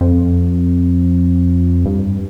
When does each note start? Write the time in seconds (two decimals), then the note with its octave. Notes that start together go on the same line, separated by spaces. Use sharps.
0.01 F2
1.86 G2